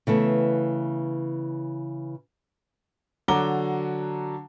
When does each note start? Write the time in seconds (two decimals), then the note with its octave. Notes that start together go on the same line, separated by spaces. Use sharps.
0.07 C#3 E3 A3 B3
3.28 D3 F#3 F#4 A#5 D6 G7